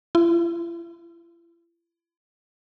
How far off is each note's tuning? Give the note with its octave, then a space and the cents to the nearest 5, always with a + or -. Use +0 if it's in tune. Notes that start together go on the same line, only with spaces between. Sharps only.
E4 +45